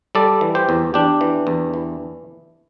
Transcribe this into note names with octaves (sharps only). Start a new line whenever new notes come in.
G3 A4 D5
E3
G4 C5
E2
E2 D4 G4
E3
E2
E3